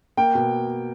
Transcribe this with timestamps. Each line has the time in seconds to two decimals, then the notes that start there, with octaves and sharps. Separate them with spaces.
0.17 A#3 G5
0.35 B2